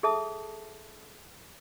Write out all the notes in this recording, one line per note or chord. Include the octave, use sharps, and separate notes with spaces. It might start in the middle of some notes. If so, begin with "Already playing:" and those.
G#4 A4 E5 A5 D#6